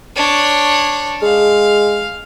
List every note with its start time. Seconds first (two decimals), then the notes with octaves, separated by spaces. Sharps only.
0.16 D4 C#5
1.22 G#3 F5